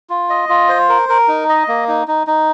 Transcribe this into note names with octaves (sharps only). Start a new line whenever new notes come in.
F4
D#5
F4
C5
A#4
A#4
D#4
D#5
A#3
D#4
D#4
D#4